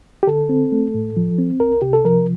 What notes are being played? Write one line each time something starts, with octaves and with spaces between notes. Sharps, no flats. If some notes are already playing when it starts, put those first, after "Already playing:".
G4
D3 A4
C4
A3
A2
F3
C4
C2 A#4
C3 G4
A4
F3 A#4